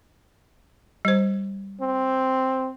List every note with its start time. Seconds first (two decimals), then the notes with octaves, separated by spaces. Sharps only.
1.05 G3 C5
1.81 C4